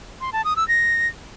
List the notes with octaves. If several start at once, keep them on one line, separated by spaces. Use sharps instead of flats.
C6
A5
D#6
E6
A#6